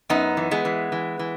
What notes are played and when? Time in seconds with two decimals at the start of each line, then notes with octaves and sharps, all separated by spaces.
0.10 F#2 B3 D#4
0.37 E3
0.51 G#3 B3
0.65 E3
0.92 E3
1.19 E3